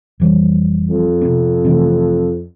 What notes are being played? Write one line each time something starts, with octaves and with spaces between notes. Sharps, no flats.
F1 E3 G3
F2
C3 B3 C4
C3 E3 A3